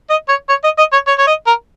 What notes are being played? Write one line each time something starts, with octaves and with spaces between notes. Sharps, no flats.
D#5
C#5
C#5
D#5
D#5
C#5
C#5
C#5
D#5
A#4